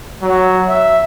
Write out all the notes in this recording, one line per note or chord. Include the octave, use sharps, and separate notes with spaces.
F#3
E5